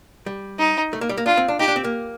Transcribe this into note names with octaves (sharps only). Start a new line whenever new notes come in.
G3
D#4
A3
A#3
G3
A#3
D4 F4
C4
D4
D#4 G4
D4
C4
A#3